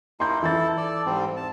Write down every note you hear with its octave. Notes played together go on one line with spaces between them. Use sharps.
A#3 D#4 E4 C6 G6
E3 E4 A4 A6
A4 D5
G#2 G3 C4
A5